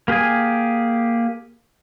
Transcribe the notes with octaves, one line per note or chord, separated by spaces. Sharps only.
A#3 G4 G#4 G#5